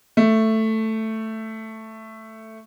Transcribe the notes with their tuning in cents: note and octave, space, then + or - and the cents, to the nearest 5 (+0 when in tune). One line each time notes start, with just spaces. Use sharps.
A3 +5